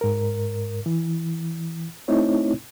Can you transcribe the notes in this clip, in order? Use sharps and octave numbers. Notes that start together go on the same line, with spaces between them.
G#2 A#4
E3
A3 C4 D#4 E4 C#5